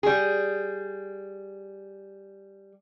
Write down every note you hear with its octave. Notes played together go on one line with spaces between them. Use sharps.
G3 G#4